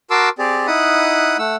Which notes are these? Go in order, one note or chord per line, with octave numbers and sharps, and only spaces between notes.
F#4 A#4 A5 C6 D6 E6
C4 G4 G#4 D5
D#4 E4 F#5 B5 D#6 F#6
A3 F#5 E6